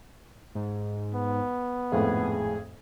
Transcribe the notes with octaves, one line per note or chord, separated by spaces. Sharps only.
G#2
B3
G#1 F2 A2 G#4